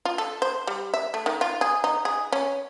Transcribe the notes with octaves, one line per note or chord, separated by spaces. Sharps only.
F4
A4
C5
G3
E5
A3
D#3
F4
G#4
D#4
G#4
C#4